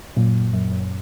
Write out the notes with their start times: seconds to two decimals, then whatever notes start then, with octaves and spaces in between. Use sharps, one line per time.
0.16 F#2 A#2
0.53 F#2
0.71 F#2